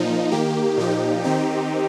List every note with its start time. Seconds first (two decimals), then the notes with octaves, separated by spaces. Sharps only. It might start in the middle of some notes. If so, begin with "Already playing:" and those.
Already playing: A#2 F3 D#4
0.32 D#3 A#3 G4
0.77 A#2 F3 D#4 G4
1.24 D#3 C4 D#4 G4